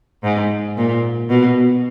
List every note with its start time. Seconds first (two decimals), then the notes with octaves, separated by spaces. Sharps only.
0.24 G#2
0.77 A#2
1.30 B2